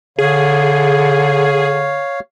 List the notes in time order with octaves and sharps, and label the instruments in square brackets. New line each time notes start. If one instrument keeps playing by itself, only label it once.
[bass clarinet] D3 [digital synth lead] G#4 [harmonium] C#5 F5